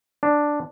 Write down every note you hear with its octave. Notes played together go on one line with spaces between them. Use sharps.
D4